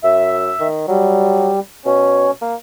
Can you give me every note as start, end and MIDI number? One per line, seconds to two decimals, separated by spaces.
0.04 0.51 42
0.04 0.67 76
0.60 0.87 51
0.88 1.50 54
0.88 1.60 55
1.86 2.28 47
1.86 2.31 61
2.42 2.55 58